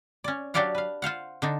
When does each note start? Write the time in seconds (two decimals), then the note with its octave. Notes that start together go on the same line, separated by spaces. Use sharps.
0.24 C#4 D5
0.54 F#3 D4 G4 D5 F5 F#5
0.75 B4 F5
1.02 F4 C5 F5 F#5
1.42 D3 D4 D#4